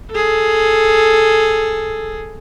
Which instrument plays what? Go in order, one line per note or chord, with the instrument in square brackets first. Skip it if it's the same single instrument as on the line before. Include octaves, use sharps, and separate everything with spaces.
[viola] G#4 A4